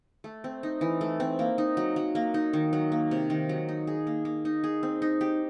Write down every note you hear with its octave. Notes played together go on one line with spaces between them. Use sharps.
A3
C4
D#4
E3
A3
C4
A#3
D#4
F#3
F#3
A#3
D#4
D#3
F#3
A#3
C3
D#3
F#3
D#4
G#4
A#3
A#3
D#4
G#4
C4
D#4
G4